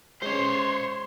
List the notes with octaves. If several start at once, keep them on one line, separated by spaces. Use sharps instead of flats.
G#3 C#4 C5 C#5 C6